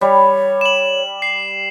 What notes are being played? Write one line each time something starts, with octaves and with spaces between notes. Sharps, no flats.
G3 C#5
E7 F#7
C7